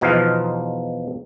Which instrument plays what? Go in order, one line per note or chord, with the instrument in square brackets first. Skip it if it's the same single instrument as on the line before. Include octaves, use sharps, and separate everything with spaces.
[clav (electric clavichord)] E2 B2 F3 D#4 F4 F5